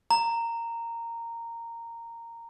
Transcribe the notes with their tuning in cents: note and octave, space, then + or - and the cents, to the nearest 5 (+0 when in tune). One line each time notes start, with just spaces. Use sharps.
A#5 -10